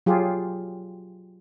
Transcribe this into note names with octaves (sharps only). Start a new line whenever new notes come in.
F#3 F4 G4 G#4